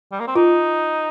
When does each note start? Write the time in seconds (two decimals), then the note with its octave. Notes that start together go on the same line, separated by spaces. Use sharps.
0.12 G3
0.20 A#3
0.28 C4
0.35 D#4 F4